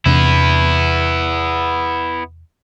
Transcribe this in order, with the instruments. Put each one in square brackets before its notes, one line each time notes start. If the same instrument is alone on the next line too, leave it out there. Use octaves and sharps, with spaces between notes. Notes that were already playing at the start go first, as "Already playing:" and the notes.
[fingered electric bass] E2 C3 D4 [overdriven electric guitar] B3 E4